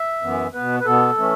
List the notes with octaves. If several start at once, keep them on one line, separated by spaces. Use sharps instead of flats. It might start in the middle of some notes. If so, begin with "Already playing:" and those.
Already playing: E5
F#2 E3 B3
B2 B3 B4
B4
B2 B3 A4
E3 A3 C#4